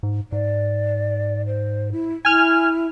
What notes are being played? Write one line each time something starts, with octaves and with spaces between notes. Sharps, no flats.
G#2
G#2 D5
C5
E4
E4 G#5 F6